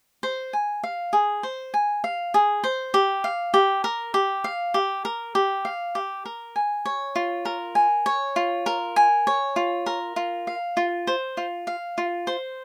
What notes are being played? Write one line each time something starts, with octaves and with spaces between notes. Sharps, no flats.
C5
G#5
F5
G#4
C5
G#5
F5
G#4
C5
G4
F5
G4
A#4
G4
F5
G4
A#4
G4
F5
G4
A#4
G#5
C#5
F4
A#4
G#5
C#5
F4
A#4
G#5
C#5
F4
A#4
F4
F5
F4
C5
F4
F5
F4
C5